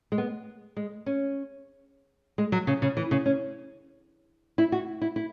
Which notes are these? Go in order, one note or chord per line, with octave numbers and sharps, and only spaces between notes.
G#3
B3
G#3
C#4
G#3
F#3
C#3
C#3
E3
C#3
C#4
E4
F#4
E4
E4